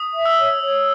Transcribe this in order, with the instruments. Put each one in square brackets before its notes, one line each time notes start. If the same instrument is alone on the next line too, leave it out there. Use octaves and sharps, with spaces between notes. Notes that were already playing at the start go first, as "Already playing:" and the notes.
Already playing: [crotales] D#6
[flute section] E5
[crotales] E6
[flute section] C#5
C#5